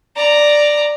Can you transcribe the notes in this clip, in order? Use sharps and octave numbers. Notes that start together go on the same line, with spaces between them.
D5 A#5